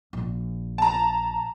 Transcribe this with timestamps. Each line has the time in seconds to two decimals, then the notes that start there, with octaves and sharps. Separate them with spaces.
0.13 A#1
0.78 A5 A#5